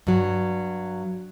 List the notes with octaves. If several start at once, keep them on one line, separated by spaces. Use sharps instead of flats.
G2 F#3